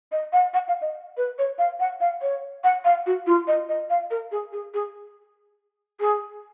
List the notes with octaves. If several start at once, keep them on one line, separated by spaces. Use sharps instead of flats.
D#5
F#5
F#5
F5
D#5
B4
C#5
F5
F#5
F5
C#5
F#5
F5
F#4
F4
D#5
D#5
F5
A#4
G#4
G#4
G#4
G#4